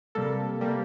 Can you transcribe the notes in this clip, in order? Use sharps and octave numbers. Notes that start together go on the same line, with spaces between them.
C3 G3 A#3 A4
C3 G3 A#3